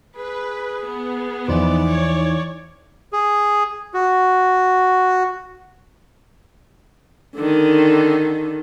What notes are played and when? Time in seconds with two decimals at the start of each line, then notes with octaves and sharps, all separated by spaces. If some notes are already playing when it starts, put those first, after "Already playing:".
0.17 G#4 B4
0.86 B3
1.48 E2 E3 F3 D#4 C5 D5
1.88 C#5
3.13 G#4
3.94 F#4
7.36 D3 D#3